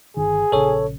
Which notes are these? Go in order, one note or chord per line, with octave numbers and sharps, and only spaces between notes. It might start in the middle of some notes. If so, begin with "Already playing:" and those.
G1 D#3 G#4
A#1 C#3 A4 C#5